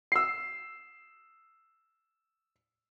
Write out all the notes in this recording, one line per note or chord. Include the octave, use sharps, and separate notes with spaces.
E6 C7